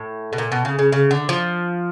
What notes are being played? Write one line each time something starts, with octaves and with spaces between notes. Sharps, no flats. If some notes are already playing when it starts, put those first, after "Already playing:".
Already playing: A2
B2
A#2
B2
C#3
C#3
C#3
D3
F3